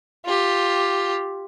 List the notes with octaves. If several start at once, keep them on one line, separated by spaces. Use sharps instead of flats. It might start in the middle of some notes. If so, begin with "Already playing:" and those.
F4 G4